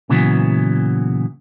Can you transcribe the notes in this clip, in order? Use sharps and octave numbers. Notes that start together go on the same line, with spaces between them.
A#2 C#3 E3 F#3 B3